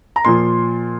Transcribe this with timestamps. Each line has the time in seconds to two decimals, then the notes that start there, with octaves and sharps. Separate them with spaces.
0.16 A#5
0.25 A#2 F3 C6